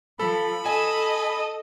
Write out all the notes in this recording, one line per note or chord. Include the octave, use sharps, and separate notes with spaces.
F3 A4 B5
A4 D#5 G#5